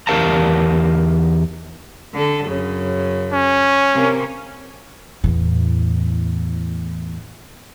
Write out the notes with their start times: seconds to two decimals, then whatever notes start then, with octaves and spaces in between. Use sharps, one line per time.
0.07 E2 G4 A#4 F5 A5 A#5
2.12 D3 A4
2.44 F#2 C#3
3.32 C#4
3.93 C3 A#3
5.24 E2 A2